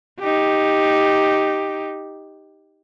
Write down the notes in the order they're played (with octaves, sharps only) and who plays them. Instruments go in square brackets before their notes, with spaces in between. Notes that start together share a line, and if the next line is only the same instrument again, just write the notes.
[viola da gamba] D#4 G4